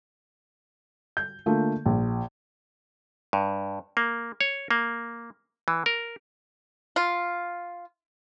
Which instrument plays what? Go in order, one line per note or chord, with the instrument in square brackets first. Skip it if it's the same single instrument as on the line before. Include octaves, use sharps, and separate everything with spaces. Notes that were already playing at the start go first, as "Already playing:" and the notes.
[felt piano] G6
D3 A3 A#3 F4
A#1
[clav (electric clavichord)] G2
A#3
C#5
A#3
E3
A#4
[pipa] F4